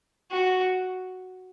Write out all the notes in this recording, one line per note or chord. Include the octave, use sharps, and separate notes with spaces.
F#4